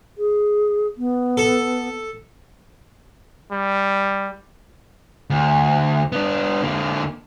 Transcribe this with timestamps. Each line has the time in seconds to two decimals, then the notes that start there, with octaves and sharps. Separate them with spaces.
0.18 G#4
0.98 B3
1.37 A4
3.52 G3
5.30 D2
6.12 B3 D4
6.62 D3 A#3